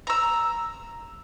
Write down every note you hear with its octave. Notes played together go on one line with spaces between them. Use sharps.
A#5 E6